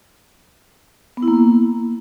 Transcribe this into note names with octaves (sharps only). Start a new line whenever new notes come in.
B3
E4
A#3